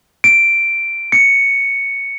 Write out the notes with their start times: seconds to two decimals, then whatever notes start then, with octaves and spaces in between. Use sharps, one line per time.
0.24 D7
1.12 C#7